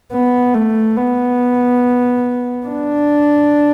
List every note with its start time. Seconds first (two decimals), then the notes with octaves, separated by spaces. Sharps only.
0.13 B3
0.54 A3
0.97 B3
2.67 D4